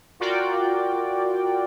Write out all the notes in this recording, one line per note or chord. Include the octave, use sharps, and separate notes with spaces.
F4 F#4 A#4 D5 G5